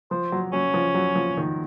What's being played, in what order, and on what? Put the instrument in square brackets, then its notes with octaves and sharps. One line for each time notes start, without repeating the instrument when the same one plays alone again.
[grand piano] F3 [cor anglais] C5
[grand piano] F#3
[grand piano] F#3 [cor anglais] C#4
[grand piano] F3
F#3
F3
D#3